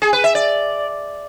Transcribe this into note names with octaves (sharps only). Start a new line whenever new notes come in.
G#4
B4
E5
D5